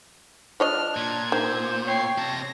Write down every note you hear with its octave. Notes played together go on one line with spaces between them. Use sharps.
F3 D4 C#5 D#5 F6
A#2 G#6
D#3 C5
C#5 G5 C7
C3 A5 A#6